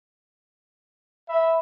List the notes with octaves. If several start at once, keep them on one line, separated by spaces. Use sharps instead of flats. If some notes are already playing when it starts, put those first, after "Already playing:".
E5 B5